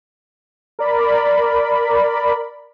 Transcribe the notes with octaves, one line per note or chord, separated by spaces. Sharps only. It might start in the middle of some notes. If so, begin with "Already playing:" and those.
A#4 D5 B5